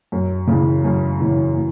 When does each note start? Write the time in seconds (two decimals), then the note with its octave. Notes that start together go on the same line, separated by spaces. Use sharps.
0.12 F#2
0.47 C#3 E3
0.84 F#2
1.20 C#3 E3
1.56 E3